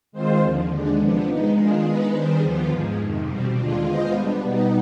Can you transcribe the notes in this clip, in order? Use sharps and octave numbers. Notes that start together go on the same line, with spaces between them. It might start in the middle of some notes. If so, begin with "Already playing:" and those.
D#3 G#3 C4 F4 C5
D#2 D3 F3
D#2 D3 G#3 D4
C3 F3 B3 D4
G#3 B3 D#4
D#3 G#3 D4 F4 G#4
G#3 B3 D#4 G#4 B4
D#3 G3 D4 G#4 C5
D#2 D3 F3 B3 F4
G#2 F3 G#3
F2 C3 D#3
B2 G3 C4
D#2 D3 G#3 D4 F4
G#3 B3 F4 C5 D#5
G3 B3 D4
B2 G3 B3 D#4